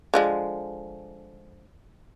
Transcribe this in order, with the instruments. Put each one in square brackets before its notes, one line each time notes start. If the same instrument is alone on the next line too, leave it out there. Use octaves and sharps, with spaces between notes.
[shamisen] D3 F3 G#3